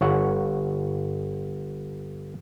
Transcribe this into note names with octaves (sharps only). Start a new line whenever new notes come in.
G1 C#5 F#5